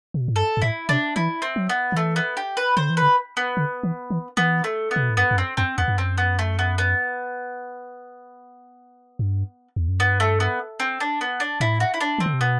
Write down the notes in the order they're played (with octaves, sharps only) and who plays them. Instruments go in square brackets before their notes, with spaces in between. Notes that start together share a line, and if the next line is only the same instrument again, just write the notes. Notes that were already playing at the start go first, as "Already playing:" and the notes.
[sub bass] C3
B2
A2
[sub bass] G2 [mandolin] A4
[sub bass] G2
[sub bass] A2 [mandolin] E4
[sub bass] C3 [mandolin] D4
[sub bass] E3 [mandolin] E4
[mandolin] C4
[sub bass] F#3
[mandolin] B3
[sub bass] D3
[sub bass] E3 [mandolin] A3
[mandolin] B3
G4
B4
[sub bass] D3 [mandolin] C5
[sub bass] E3
[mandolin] B4
[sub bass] D3
[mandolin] B3
[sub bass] D3
E3
E3
[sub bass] E3 [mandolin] B3
[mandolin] A3
B3
[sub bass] C3
B2
A2
[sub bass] G2 [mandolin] B3
[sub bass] G2
[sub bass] F#2 [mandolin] C4
[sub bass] F#2 [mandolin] C4
[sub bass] E2 [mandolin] B3
[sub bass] G2
[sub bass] F#2 [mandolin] C4
[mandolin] B3
A3
B3
B3
[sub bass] G2
E2
F#2
[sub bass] G2 [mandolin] B3
[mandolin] A3
B3
C4
D4
B3
D4
[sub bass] A2 [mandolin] E4
[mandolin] F#4
E4
D4
[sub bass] E3 [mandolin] C4
[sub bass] D3
C3
[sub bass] B2 [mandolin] B3